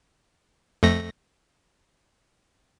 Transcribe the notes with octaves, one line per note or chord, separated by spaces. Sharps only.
F2 A3 A#6